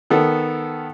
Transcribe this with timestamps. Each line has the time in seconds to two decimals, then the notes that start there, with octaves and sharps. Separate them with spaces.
0.10 D#3 B3 A4